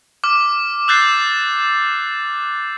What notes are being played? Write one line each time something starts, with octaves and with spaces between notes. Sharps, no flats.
D6 F6
E6 F#6 G6 A6 C7